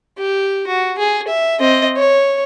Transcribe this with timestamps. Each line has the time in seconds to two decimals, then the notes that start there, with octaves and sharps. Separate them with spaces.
0.18 G4
0.67 F#4
0.98 G#4
1.28 E5
1.59 C4 D#5
1.96 C#5